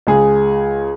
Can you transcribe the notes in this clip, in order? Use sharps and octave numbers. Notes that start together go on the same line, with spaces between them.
C#2 G#4